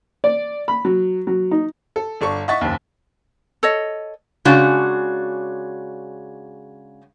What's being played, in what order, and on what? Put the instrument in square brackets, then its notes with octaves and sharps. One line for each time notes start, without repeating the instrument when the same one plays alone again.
[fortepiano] D5
B5
F#3
F#3
D#4
[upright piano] A4
G1 D4 A4 C#6
D#5 E5 F#5 C#6 A6 B6
F#1 D#2
[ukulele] A4 C#5 D#5
[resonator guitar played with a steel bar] C#3 G#3 D4 F#4